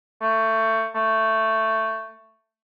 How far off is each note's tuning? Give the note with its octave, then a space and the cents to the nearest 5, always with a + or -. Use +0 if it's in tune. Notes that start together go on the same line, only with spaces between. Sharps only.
A3 +20
A3 +10